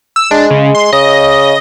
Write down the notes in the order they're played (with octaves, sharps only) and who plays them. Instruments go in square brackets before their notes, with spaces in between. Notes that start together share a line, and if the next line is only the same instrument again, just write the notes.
[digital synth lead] E6
[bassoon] G#3 [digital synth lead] D4
[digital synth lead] C#3
C6
[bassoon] C#3 [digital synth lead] D#5